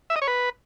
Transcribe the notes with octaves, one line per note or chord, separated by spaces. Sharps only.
E5
D#5
C#5
B4